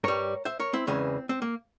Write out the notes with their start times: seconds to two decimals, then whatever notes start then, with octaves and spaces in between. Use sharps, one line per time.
0.04 G2 G3 A#4 C#5
0.45 C5 E5
0.60 A#4 C#5
0.73 C4 E4
0.87 E2 C#3 E3 G#3 C4
1.29 C4
1.42 A#3